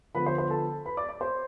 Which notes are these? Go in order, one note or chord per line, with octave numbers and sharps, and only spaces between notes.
D3 F3 B3 B4 B5
C5 C6
C5 C6
A4 A5
B4 B5
D5 D6
D5 D6
C5 C6